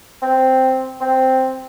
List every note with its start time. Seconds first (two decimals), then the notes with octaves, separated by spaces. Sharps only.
0.22 C4
1.01 C4